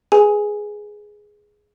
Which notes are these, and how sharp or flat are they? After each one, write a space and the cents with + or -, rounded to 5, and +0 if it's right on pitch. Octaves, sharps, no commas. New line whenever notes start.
G#4 +5 B4 +0 G#5 +0